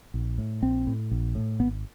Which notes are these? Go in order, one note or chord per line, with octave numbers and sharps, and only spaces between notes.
A#1
A2
A#1 C4
A2
A#1
A2
G#1 B3